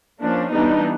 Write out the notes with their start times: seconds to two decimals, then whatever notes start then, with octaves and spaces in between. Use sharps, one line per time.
0.20 F3 A#3 C#4 D4
0.51 E3 G3 B3 D4 D#4